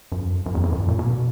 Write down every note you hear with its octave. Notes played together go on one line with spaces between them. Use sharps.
F#2
F#2
E2
F2
F#2
A#2
B2